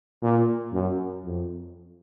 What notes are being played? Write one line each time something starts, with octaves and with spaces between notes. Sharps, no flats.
A#2
F#2
F2